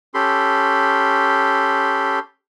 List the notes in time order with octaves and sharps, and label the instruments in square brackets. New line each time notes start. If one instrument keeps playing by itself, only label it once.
[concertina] C#4 G4 A4 B5 C6